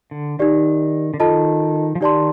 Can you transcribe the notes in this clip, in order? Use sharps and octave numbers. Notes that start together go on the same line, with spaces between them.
D3
D#3 D#4 G4 D5
D3
D#3 F4 A4 D#5 A5
F3
D#3 D#4 G4 D5 A5 C6